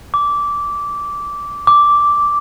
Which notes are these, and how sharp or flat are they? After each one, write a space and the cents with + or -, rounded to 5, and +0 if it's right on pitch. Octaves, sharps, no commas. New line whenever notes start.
D6 -15
D6 -5